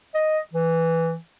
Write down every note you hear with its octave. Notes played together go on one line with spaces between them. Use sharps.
D#5
E3